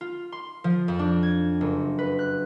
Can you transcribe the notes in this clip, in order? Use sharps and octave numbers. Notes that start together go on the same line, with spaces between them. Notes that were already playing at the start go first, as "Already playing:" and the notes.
F4
C6
F3
F2
D4
G#6
F#1
B4
F#6